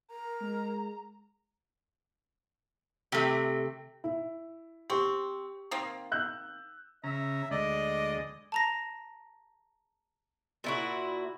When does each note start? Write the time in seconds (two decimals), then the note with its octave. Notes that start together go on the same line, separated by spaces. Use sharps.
0.11 A#4 A#5
0.40 G#3
3.12 C3 A3
4.04 E4
4.90 C4 G4 C#6
5.71 D#3 A#3 C4
6.12 E6 F#6 G6
7.04 C#3 E5 A#5
7.51 D2 G#3 D5 D#5
8.52 A5 A#5 A#6
10.64 A#2 E4 F#4